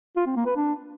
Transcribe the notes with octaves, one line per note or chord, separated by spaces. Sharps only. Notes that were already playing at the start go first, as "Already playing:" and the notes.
F4
C4
A#3
B4
D4